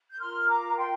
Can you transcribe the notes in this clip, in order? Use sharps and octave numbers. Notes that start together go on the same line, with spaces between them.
G6
F4 A#4 C6 F6
A#5 D6
G5 C6